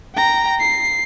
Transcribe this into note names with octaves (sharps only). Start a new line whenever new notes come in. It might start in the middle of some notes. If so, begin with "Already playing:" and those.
G5 A#5
C7